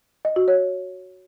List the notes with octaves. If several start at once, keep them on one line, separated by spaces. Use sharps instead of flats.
D#5
F#4
C#5